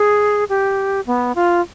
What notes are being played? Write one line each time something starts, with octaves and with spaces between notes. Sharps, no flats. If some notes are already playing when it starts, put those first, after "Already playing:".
Already playing: G#4
G4
B3
F4